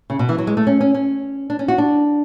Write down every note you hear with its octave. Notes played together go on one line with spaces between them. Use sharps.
C#3
B2
E3
F#3
G#3
A3
C#4
C#4
C#4
D4
C#4
F#4
D4